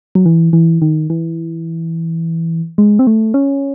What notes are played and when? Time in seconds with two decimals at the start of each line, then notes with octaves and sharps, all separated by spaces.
0.15 F#3
0.26 E3
0.53 E3
0.82 D#3
1.10 E3
2.78 G#3
2.99 C4
3.07 A3
3.34 C#4